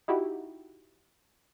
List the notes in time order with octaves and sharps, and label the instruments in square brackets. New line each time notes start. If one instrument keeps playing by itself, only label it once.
[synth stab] D#4 E4 F#4 G4